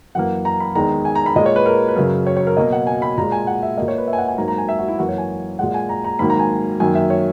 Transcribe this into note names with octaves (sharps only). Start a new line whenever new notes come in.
F#2 E3 A#3 F#5
A#5
B5
E2 D#3 G#3 A#5
G#5
A#5
B5
A#2 G#3 D#5
C#5
B4
A#4
B4
F#2 C#3 F#3 A#4
C#5
C#5
A#4
B2 F#3 A#3 D#5
F#5
G#5
B5
A#2 G#3 A#5
G#5
F#5
E5
A#2 A#3 D#5
C#5
B4
E5
G#5
F#5
G#5
G#2 F#3 A#3 A#5
A#5
G#5
E5
F#4
E4
F#2 E3 A#3 F#4
C#5
G#5
A#2 G#3 F#5
G#5
A#5
A#5
G#2 D#3 F#3 A#3 B5
A#5
G#5
F#2 D#3 F#3 A#3 G#5
E5
C#5